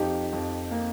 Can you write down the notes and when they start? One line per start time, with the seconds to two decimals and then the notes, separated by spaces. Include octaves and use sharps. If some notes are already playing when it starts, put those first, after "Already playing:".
Already playing: F2 F3 D#4 G4
0.33 F2
0.71 A#3